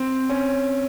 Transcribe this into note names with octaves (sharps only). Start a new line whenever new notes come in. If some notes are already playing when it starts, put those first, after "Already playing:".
Already playing: C4
C#4